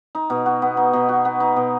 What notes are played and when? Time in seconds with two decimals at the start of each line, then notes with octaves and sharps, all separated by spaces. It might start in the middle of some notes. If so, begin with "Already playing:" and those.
0.15 D#4
0.30 B2
0.46 F#4
0.62 B3
0.77 D#4
0.93 B2
1.09 F#4
1.25 B3
1.40 D#4
1.56 B2